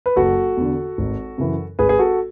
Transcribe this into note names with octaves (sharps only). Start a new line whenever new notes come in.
B4
F#1 F#4 A4
E2 D3
G#1
F#2 C#3 E3
G#1 G#4 B4
G#4
F#4 A4